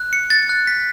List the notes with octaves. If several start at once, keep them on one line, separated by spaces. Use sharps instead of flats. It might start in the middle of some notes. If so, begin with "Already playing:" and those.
Already playing: F#6
C#7
A6
F#6
B6